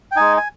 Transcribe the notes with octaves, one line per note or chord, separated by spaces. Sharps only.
G5
G#3 D#4 G#5
G#5